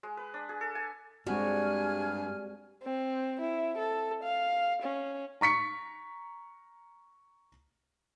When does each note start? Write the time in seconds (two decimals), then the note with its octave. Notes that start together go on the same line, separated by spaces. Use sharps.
0.03 G#3
0.17 B4
0.34 D4
0.49 G#4
0.61 A4
0.75 G#5
1.27 G2 G3 G#3 C4 F#4 G#5 F6
2.83 C4
3.41 E4
3.78 A4
4.24 F5
4.83 C#4
5.41 A#5 C#6 B6 C#7